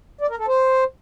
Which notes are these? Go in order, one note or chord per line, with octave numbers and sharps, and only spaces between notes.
D5
A#4
A4
C5